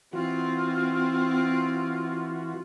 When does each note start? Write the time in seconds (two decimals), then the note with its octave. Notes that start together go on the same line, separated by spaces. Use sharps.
0.13 E3 C4 F4 F#4